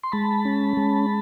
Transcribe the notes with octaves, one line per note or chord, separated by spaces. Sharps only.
C6
G#3 A5 B5
C#4
G#3